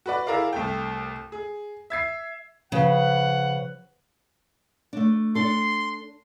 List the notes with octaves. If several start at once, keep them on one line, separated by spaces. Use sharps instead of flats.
F#4 B4 D5
E4 G#4 A#4 D5 F5
C2 A3 G5
G#4
E5 G#6 C7
C#3 F3 B4 F#5
A3 D4
D4 A4 C6